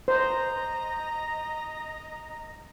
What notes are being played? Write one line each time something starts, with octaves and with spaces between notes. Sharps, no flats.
C5 D#5 A#5